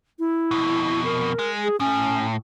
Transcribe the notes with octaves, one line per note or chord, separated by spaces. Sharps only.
E4
F2 B2
A#4
G#3
G#4
A2 C#4